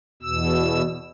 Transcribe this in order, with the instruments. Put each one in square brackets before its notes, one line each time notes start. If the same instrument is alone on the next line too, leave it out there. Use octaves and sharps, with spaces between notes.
[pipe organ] E2 B2 E6